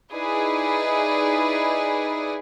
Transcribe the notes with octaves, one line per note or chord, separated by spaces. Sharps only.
D#4 E4 G#4 B4 D5